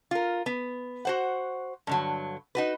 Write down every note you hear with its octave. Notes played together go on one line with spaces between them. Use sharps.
F4 A#4
B3
F#4 C5 F#5
G2 D3 F#3
D#4 F#4 B4